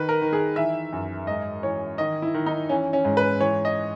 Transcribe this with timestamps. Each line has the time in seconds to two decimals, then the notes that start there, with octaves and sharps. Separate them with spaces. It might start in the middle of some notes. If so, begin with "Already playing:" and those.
Already playing: D#3 B4
0.09 A#4
0.21 D#3
0.33 G#4
0.56 E3 E5
0.93 F#2
1.27 G#2 D#5
1.63 E3 C#5
1.98 D#3 D#5
2.22 E4
2.34 D#3
2.46 D#4
2.69 E3 C#4
2.93 C#4
3.05 G#2
3.17 B4
3.40 E3 C#5
3.65 D#5